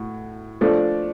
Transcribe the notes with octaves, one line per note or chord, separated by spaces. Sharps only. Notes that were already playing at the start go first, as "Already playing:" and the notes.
Already playing: A2 F#4
F3 A3 D4